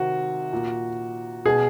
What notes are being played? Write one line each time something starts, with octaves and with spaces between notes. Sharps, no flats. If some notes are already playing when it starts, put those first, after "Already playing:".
Already playing: C3 D#3 F#4
A#2
B2 G#4